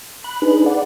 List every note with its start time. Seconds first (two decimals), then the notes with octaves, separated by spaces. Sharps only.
0.24 B5 F#6
0.42 D4 D#4 G#4 B4
0.66 D5 F#5